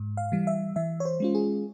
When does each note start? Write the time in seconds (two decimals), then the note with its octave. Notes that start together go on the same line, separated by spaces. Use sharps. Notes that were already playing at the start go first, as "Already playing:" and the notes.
Already playing: G#2
0.17 F5
0.32 E3 G3
0.47 E5
0.76 E3 E5
1.00 C#5
1.05 C5
1.20 G#3 C#4 F4
1.35 G#4